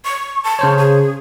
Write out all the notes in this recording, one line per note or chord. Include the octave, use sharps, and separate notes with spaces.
C#6
A5
C#3 C5 C#5
G#4